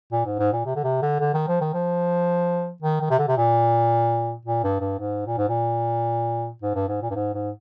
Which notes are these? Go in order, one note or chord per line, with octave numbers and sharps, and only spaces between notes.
A#2
G#2
G#2
A#2
C3
D3
C3
D3
D3
D#3
F3
D#3
F3
D#3
D#3
C3
D3
C3
A#2
A#2
G2
G2
G#2
A#2
G#2
A#2
G#2
G2
G#2
A#2
G2
G#2
G#2